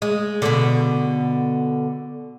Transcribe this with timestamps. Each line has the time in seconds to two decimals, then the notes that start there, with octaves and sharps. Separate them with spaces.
0.02 G#3
0.42 B2 D3